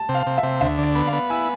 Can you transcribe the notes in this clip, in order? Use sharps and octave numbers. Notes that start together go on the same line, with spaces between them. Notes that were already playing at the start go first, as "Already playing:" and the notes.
Already playing: A5
C3
F5
C3
E5
C3
D2 E5
D3
D5
B3
F5
B3
E4 G#5